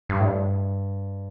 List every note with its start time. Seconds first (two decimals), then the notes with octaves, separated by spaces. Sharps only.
0.09 G2
0.20 A2
0.25 G2